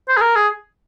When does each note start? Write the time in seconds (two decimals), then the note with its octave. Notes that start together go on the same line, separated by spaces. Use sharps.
0.08 C5
0.17 G#4
0.21 A#4
0.36 G#4